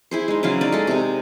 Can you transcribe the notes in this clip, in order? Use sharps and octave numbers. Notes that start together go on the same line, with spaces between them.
E4 G#4 C5
G#3 D#4
C#3 F#3 E4 F5
D#4 D5
G#3 A4
C3 G#3